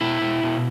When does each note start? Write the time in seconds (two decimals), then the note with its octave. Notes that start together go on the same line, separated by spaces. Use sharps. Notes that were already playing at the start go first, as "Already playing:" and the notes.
0.01 B2 E4
0.21 B2
0.43 B2